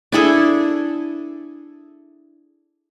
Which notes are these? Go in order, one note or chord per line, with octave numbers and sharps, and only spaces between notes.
D4 E4 G#4 A4